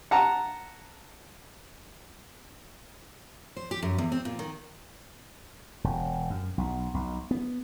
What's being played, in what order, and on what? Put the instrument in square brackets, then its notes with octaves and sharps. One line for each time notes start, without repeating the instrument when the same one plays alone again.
[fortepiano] F#5 A5 A#5
[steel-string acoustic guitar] C5
G4
F#2
E2
C4
A#2
D#3
[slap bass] E1
F#2
B1
B1
B3